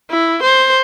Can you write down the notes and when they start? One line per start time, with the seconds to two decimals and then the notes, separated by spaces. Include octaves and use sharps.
0.10 E4
0.43 C5